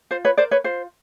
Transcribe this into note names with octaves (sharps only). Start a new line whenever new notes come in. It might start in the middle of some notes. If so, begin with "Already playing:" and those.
F4 C5
B4 C#5
A#4 C5 D5
B4 C#5
F4 C5